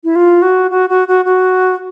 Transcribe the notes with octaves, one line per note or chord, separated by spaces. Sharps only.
E4
F4
F#4
F#4
F#4
F#4
F#4